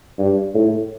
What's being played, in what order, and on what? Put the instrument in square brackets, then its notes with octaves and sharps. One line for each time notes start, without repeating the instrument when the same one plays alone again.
[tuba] G2
A2